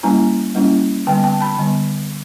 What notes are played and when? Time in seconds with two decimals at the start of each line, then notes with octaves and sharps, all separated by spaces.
0.03 G3 A#3 C#4 E4 G#5 A#5
0.55 G3 A#3 C#4 E4
1.07 D3 G3 B3 G5 A5
1.24 G5 A5
1.41 A5 B5
1.58 D3 G3 B3